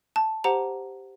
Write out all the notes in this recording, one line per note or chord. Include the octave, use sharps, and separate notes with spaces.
A5
G4 C5 F#5 A#5